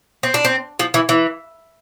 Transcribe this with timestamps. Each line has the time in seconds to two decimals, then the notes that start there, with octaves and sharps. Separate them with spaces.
0.23 C4
0.34 D4
0.45 C4
0.79 F3
0.94 E3
1.09 E3